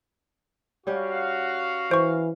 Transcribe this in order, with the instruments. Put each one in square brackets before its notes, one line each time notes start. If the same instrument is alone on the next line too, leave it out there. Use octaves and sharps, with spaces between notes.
[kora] G3 C#4 G4 [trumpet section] F#4 F5
[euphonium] E3 [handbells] C5 C#6